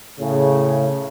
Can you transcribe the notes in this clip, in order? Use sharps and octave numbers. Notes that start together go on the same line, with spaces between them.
A2 C#3